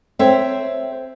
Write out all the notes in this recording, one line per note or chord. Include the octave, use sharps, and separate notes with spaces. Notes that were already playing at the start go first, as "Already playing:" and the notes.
C4 A4 C#5 E5